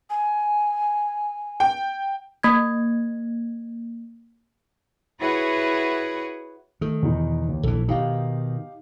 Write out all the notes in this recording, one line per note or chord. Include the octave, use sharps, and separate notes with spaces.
G#5
G5
A#3 G#6
E4 F#4 G#4 B4 C#5 F#5
D#3 A3
E2 B2 D#4
D#2
A#1 E3 A4
B2 D#3 D#4 G4 F5